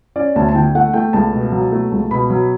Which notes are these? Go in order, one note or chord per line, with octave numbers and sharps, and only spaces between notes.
C#4 D5
D2 A5
A5
D3 G5
A3 F#5
A3 G5
C#2 A5
B2
F#3
A3
C#2
B2 B5
F#3